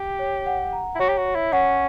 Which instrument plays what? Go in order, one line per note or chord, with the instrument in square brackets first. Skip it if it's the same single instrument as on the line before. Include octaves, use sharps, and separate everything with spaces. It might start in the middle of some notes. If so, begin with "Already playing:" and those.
Already playing: [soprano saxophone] G4
[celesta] C#5
F#5
A#5
[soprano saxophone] E4
[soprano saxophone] F#4 [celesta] C#5
[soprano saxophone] G4
F#4
[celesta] C#5
[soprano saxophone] E4
[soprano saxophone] C#4 [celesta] F#5